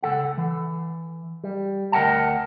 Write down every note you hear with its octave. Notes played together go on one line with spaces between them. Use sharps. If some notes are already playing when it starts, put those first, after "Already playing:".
C#2 C3 A4 F#5
E3
G3
D2 A#4 D#5 F#5 G5 A5